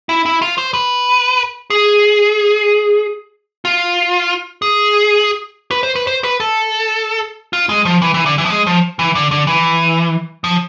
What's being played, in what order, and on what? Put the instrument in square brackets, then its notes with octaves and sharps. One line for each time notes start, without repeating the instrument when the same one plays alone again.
[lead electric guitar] E4
E4
F4
C5
B4
G#4
F4
G#4
B4
C5
B4
C5
B4
A4
F4
G#3
F3
E3
E3
D3
E3
F3
G#3
F3
E3
D3
D3
E3
F3